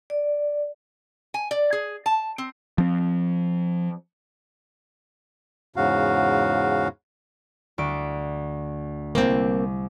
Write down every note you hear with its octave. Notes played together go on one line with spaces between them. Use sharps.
D5
G#5
D5
G#4
A5
C4
F3 C4
E2 G#2 C#3 F#4 F5
D2 D7
C2 A#3 C4